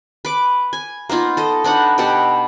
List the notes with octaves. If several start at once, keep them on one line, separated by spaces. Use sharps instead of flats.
B4 D6
G#5
A#3 B3 D#4 F4
A4 D#5
B3 D4 D#4 F#5
B2 B3 G4 F#5